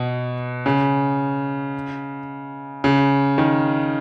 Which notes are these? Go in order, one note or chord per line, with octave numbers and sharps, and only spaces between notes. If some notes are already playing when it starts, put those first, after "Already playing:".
Already playing: B2
C#3
C#3
D#3